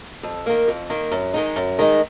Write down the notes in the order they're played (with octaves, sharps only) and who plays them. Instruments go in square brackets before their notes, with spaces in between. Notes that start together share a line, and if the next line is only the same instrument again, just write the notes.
[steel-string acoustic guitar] F2
D#3 A#3
F2
D#3 A#3
F#2
D#3 G#3 D#4
F#2
D#3 G#3 D#4